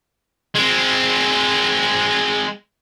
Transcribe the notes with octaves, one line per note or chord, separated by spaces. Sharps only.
G#3 C4